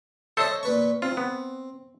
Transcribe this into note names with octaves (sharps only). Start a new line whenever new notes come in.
A4 C5 C#5 D#5 E5 A5
A#2 B4 C#6
C4 F4
B3